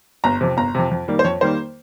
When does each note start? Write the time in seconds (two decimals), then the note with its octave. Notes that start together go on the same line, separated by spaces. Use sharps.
0.24 G1 A#5
0.41 F2 C3
0.57 G1 A#5
0.75 F2 C3
0.91 F2
1.08 D#3 G3 A#3
1.19 C5
1.24 F2 C#5
1.41 D#3 G3 A#3 C5